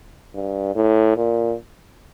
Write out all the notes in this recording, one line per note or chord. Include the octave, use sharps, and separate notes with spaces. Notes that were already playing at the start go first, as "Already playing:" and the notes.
G2
A2
A#2